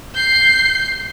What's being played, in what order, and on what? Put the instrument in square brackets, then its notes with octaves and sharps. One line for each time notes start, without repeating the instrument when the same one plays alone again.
[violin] G6 C7